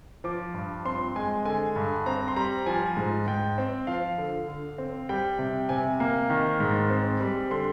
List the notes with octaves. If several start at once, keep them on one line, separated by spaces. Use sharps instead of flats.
F3 D6
G2
C4 C6
G#3 G#5
D3 G#5
G2
C4 A#5
C6
G3 A#5
F3 G#5
G#2
G#2 G5
C4
F3 F5
D3
D3
C4
G3 G5
C3
C3 G#5
A#3
D#3
G#2
C4
G3
D3 C6